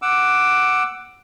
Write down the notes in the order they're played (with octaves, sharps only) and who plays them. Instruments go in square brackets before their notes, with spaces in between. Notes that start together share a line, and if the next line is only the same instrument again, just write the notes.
[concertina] F#5 D6 E6